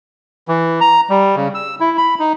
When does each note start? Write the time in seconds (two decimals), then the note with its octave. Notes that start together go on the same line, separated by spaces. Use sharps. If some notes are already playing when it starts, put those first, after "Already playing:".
0.48 E3
0.81 A#5
1.10 G3
1.36 C#3
1.54 E6
1.80 E4
1.97 B5
2.19 D#4